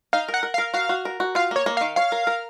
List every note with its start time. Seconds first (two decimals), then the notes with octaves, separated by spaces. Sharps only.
0.13 D#4 F5
0.28 A#4
0.34 F#5
0.43 A#4
0.54 F5
0.58 A#4
0.74 F#4 F5
0.89 F#4
1.05 A#4
1.20 F#4
1.35 F4 F5
1.51 A#3 C#5
1.66 A#3
1.77 F5
1.81 D#3
1.96 C#5 F5
2.12 A#4
2.27 A#4